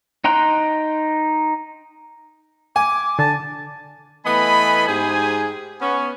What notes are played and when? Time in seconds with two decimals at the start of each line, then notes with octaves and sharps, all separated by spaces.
0.24 D#4 G5 A#5 C6 F#6
2.76 G#5 D6
3.19 D3 A5
4.25 E3 A3 B3 D#5 G#5 B5
4.88 G#2 G4 G#4 C5 G#5
5.81 B3 C#4